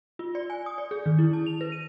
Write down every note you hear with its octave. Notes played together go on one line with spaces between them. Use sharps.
F4
D5
G#5
D#6
D5
G#4
D#3
E4
A5
F7
B4
D#7